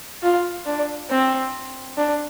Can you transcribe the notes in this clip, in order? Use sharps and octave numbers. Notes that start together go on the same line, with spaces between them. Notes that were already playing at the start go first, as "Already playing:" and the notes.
F4
D4
C4
D4